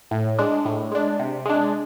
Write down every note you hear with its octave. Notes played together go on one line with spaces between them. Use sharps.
A2
G#3 D4
A2
G#3 D4
C3
G#3 D4